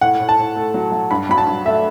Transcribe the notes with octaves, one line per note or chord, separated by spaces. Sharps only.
A2 F#5
A2
A5
A2
A3
F#3
F#3
G2 B5
F#3 B5
A5
G2
A3 E5